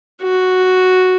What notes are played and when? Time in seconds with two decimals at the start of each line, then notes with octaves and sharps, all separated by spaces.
0.22 F#4